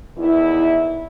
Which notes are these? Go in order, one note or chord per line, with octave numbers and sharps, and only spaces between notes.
E2 D#3 E4